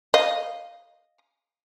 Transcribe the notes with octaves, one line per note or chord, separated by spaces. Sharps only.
D#5 F5